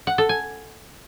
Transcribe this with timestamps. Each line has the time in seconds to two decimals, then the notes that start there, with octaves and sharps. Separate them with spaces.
0.07 F#5
0.18 A4
0.29 G#5